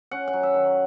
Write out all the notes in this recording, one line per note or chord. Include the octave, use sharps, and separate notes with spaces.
C#4 F#5
F#5
F#3
E5
D#3